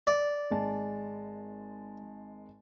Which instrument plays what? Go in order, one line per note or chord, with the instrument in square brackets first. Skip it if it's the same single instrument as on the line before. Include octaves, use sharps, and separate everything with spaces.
[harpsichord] D5
[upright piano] G#1 G#3 A5